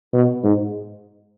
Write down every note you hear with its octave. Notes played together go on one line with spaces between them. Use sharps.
B2
G#2